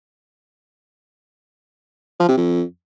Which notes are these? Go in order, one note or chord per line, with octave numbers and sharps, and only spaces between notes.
F3
C3
F2